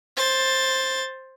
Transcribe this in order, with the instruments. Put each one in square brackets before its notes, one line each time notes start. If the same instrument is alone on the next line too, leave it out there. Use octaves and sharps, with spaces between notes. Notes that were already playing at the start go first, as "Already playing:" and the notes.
[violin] C5 A6